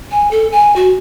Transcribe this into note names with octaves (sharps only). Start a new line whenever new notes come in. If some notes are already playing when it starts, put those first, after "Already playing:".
G#5
A4
G#5
F#4